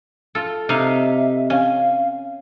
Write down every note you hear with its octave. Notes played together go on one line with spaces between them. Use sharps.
F4 A4
C3 D#4 E5 F5
C#4 F5